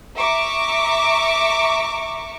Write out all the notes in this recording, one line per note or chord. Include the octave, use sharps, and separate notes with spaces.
E5 A#5 C#6 D6